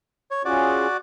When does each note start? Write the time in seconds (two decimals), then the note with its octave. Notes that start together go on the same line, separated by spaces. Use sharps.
0.31 C#5
0.45 C#4 F4 F#4 G#4 D5